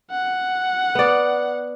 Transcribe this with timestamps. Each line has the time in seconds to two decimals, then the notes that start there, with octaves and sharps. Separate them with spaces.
0.11 F#5
0.95 B3 D5